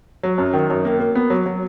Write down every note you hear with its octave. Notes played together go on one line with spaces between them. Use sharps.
F#3
F#2
D#3
F#2
A#3
A#3
B3
F#3
F#3